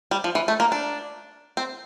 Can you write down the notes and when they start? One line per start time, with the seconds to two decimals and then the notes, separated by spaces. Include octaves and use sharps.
0.11 G3
0.24 F3
0.35 E3
0.48 A3
0.60 A#3
0.72 D4
1.57 C4